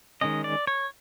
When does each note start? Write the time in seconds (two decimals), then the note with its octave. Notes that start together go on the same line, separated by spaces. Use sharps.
0.21 D#3 G#3 C#4 D#5
0.44 D5
0.67 C#5